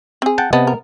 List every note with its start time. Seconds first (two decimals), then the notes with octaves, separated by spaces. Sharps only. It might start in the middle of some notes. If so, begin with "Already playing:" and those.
0.22 C4 G#4
0.38 F#5 G5 A5
0.53 C3 B3 D#5 A5
0.67 A#4